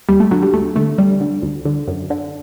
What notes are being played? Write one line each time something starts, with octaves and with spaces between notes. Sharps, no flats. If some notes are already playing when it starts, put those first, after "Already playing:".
D#2 G3
A3
D3 F#3
G3
D#2 A3
D3 A3
D2 G3
D3
D2
D3
F#2
D3